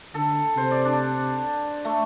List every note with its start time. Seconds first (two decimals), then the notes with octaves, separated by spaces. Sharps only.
0.14 D3 A4
0.56 C3 C5
0.71 D5
0.85 D4
1.85 A3